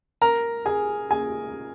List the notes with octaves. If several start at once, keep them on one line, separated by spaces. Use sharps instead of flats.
A#4 A#5
G#4 G#5
G#4 G#5